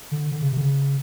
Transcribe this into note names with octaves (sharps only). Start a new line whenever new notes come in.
D3
D3
C#3
C3
D3
C#3